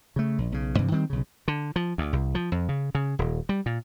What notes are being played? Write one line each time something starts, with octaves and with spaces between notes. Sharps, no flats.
C#3 A3
A#1
B1 C#3
G2 C3 E3 F3
D#3 G3 C4
B1 C#3
D3
F3
D2
C2
F3
F2
C#3
C#3
D#1
G3
A#2